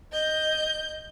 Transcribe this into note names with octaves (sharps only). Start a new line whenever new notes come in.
D#5 G6